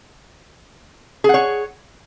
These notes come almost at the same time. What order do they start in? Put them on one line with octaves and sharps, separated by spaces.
G#4 F#5 C#5